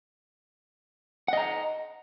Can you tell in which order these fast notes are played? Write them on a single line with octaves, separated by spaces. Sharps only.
F#5 D#5 A#5